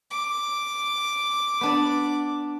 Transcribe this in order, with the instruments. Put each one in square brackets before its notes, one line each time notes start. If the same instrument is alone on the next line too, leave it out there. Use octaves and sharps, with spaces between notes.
[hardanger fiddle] D6
[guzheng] B3 D4 D5